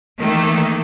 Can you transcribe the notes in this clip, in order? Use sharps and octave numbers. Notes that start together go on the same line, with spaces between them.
D#3 E3 A3 A#3